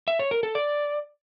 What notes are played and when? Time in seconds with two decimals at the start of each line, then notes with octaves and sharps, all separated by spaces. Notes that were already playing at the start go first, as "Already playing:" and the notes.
0.08 E5
0.19 C#5
0.31 A#4
0.43 A4
0.55 D5